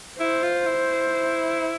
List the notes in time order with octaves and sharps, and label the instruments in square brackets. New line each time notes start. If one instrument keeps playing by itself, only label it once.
[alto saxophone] E4 [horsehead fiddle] C5
[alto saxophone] F4
E4